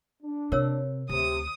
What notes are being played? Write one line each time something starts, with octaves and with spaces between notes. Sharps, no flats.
D4
C3 A#4 C#5 E6
D2 C3 D#6